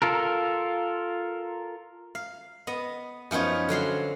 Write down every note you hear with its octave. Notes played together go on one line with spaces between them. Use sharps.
F4 A4 A#4
F5
B3 D#5
F#2 F3 B3 D#4 C#5
D3 F#3 F5 C6